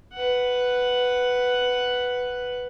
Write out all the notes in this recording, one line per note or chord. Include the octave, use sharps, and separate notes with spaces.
B4 F#5